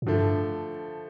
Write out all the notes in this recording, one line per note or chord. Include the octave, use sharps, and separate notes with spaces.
A2
G2 D3 F3 A3